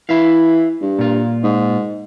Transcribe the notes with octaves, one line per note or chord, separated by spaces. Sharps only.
E3 E4 E5 F5
G2
A#2 F4
G#2